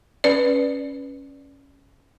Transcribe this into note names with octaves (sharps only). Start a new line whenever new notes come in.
C#4 B4 D5